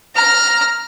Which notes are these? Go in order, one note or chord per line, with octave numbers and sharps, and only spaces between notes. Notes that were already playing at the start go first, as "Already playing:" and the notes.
A#5 F6